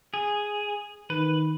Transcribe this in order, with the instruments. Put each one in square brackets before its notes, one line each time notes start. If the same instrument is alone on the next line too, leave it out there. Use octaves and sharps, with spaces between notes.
[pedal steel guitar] G#4
[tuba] D#3 [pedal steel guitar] B4